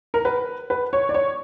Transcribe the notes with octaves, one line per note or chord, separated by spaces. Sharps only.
A#4
B4
B4
C#5
D5
C#5